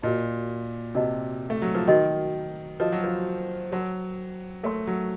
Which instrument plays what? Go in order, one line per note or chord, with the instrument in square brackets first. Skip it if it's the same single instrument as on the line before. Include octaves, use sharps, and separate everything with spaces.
[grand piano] A#2 [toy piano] F#4 A#4 D#5 A5
[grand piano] C3 [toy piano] F#4 A#4 D#5 A5
[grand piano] A3
F#3
F3
[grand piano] D#3 [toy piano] F#4 A#4 D#5 A5
[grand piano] F3 [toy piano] F#4 A#4 D#5 A5
[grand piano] F#3
F3
[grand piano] F#3 [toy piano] A#4 C#5 A5 C6
[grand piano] A3 [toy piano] A#4 C#5 A5 C6
[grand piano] F#3